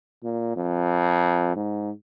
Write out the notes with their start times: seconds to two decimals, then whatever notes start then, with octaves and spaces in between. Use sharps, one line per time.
0.23 A#2
0.56 F2
1.56 G#2